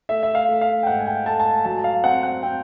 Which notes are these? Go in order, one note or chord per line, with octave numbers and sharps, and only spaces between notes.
A3 E5
E5
F5
A3
F5
G5
G#2 F#5
G#5
G5
A3 A5
A5
G#5
F#3 A5
F5
C4 F#5
F#5
C4 G5